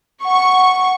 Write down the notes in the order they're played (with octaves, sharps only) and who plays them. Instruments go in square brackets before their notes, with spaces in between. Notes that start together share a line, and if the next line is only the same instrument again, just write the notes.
[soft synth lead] F#5 [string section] C#6